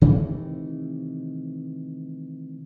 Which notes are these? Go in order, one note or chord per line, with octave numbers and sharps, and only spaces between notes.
C3 D#3 E3 A3